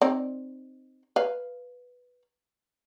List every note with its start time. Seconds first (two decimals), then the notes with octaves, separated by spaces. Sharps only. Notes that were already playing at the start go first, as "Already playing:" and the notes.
0.02 C4 D#4 D5
1.16 B4 F5